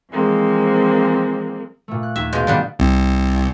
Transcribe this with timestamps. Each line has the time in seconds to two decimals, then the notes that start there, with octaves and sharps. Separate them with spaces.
0.11 E3 F3 G#3 A#3 C4
1.88 A#2 A3
2.03 F#6
2.16 D#2 E5
2.33 B2 G#3 F5 D6 G6
2.47 D#3 G3 B3 D4
2.79 C2